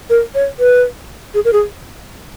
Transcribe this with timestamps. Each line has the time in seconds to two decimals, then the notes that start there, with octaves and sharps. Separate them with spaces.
0.10 A#4
0.35 C#5
0.59 B4
1.34 G#4
1.45 A#4
1.53 G#4